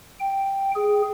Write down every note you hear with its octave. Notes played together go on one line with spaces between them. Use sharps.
G5
G#4